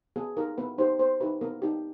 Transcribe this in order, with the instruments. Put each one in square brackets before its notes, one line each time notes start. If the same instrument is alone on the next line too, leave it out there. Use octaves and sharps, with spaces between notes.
[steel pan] B3 G#4
D#4 G4 A#4
B3 B4
D#4 G4 C5
B3 C5
D#4 G4 B4
B3 A#4
D#4 G4